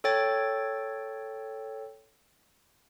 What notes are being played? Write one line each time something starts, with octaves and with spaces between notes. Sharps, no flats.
A4 C#5 G5 A6